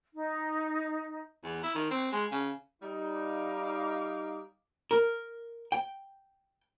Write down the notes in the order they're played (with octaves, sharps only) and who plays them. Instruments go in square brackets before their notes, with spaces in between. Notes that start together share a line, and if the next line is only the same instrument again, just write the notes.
[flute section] D#4
[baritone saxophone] E2
E4
D#3
C4
G#3
C#3
[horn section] G3 D#4
[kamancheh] F5 D6
[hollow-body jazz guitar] A#4
G5